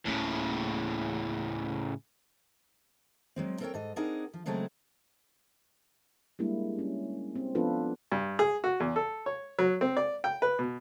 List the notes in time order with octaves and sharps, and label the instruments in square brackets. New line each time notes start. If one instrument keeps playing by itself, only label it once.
[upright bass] D1 A#3 [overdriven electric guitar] A2 C#3
[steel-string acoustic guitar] F#3 G#3 C4
C4 A4 A#4 C5 C#5 G5
G#2 A4 D#5
C4 D4 D#4 G#4 A#4 F#5
F3
C#3 F#3 G#3 A3 C4 A4
[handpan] G3 G#3 A#3 D4 E4
C#4
C4
F3 B3 D4 F4 A4 B4
[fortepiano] G2
G#4
F#4
E2
A4
C#5
F#3
C4
D5
G5
B4
B2